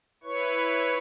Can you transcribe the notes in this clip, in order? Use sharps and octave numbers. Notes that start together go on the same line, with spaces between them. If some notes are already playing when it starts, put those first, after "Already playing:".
E4 B4 C#5 C#6